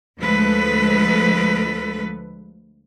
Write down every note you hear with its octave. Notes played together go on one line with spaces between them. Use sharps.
D2 F3 G#3 A4 B4